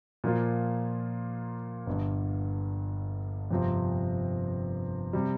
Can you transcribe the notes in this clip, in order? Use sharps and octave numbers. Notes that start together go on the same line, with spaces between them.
A#2 F3 A#3 F4
G1 G2 D3
G1 F2 C3 F3 C4
C3 G3